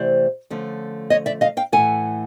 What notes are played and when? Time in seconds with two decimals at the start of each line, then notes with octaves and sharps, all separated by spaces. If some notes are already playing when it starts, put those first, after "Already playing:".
Already playing: C3 E3 A3 C5 D5
0.50 D3 F3 A3 C#4
1.10 C#5 D#5
1.26 D5 E5
1.41 D#5 F5
1.57 F5 G5
1.72 A2 E3 A3 F#5 G#5